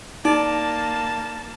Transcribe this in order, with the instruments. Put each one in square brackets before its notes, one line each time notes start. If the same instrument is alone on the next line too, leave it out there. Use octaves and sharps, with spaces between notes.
[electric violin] A#3 A5 [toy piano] D#4 [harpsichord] D5